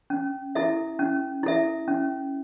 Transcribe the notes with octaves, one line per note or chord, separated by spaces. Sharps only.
C#4
E4 A4 E5
C#4
E4 A4 E5
C#4